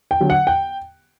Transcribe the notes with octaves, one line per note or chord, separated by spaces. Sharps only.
G5
D3 F#3
F#5
G5